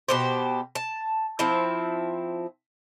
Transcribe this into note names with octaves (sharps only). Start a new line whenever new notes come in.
B2 G4 C5
A5
F3 C4 E4